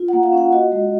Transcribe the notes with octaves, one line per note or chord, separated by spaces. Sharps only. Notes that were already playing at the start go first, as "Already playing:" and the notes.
Already playing: F4
F#5
A#3
F5
C#4 F#5
F#4 D#5
G#3